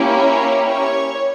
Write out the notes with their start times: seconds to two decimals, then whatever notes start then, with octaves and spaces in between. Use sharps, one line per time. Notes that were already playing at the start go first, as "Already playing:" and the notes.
Already playing: A#3 C#4 E4 G4
0.15 C#5
0.69 C#5